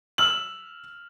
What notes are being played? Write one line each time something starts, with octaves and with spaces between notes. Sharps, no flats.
E6 F6 F#7